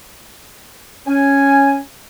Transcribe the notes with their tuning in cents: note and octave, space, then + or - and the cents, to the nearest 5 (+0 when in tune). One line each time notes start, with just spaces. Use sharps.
C#4 +0 G#5 +0